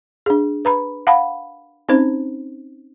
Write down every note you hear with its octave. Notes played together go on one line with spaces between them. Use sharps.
D4 G#4
B4 A#5 B5
F5 F#5 A5 B5
C4 C#4 D#4 C5